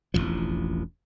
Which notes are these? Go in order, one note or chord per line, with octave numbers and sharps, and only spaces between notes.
E1 A1 D#2 F3